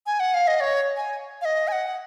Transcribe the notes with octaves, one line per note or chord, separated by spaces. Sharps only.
G#5
F#5
F5
D#5
C#5
G#5
F5
D#5
G#5
F#5